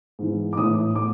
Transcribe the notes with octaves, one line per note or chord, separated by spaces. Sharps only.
G#2 E3
D6
A2 E3 D#6
A2 D6